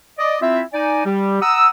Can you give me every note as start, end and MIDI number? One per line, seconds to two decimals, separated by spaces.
0.19 0.37 74
0.19 0.37 75
0.42 0.61 60
0.42 0.61 64
0.42 0.61 65
0.42 0.61 76
0.73 1.03 63
0.73 1.03 74
0.73 1.03 80
1.05 1.41 55
1.05 1.41 67
1.42 1.68 78
1.42 1.68 82
1.42 1.68 87
1.42 1.68 88